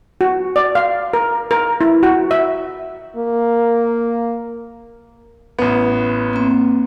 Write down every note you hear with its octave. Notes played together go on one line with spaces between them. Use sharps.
F#4
D5
F5
A#4
A#4
E4
F#4
E5
A#3
A1 B3
A#3 C4